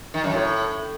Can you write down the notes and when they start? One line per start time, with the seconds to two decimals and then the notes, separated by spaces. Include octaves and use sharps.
0.14 D#3
0.24 F#2
0.34 A2